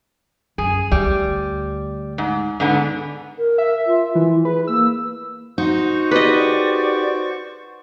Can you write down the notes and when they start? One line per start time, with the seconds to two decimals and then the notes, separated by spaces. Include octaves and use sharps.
0.58 F#2 G#4
0.92 D2 G3
2.18 G#2
2.60 G#2 D3 B3
3.38 A#4
3.58 E5
3.87 F4
4.15 E3
4.45 G#4 B4
4.67 A#3 E6
5.58 D#4 F#4 C5 C#6
6.11 G4 G#4 B4 D5 D#5